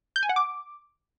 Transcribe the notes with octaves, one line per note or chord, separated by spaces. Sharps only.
G6
G#5
F#5
D6